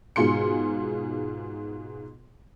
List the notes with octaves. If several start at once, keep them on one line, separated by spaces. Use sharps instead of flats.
G#2 B2 F4 G#4 C6 C#7